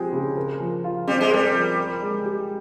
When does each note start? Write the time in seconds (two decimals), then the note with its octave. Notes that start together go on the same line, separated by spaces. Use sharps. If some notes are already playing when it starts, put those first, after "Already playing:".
Already playing: F3 G#3 C4 G4
0.12 C#3
0.37 A#4
0.60 F3
0.84 F4
1.08 G3 C4
1.21 G#3
1.31 G3 A#4
1.55 F3
1.78 A#4
2.03 G#3
2.25 G4